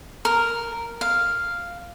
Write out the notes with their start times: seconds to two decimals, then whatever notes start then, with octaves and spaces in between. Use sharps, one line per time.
0.25 A#4
1.01 F5